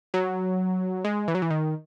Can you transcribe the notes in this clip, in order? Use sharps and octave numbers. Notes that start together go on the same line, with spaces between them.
F#3
G#3
E3
F#3
E3
D#3